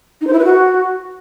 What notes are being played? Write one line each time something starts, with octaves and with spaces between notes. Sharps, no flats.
D#4
C5
E4
B4
F#4